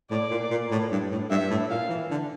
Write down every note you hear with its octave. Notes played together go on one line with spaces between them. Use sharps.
A2 D5
A#2
A#2
A2
G2
A2
G2 E5
A2
A#2 F5
E3
D3